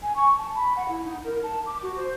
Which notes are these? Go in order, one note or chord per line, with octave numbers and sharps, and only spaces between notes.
G#5
C#6
A5
B5
F#5
E4
D#4
A#4
A5
D6
F#4
C5